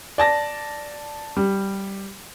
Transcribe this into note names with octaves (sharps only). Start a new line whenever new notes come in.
D5 A5 A#6
G3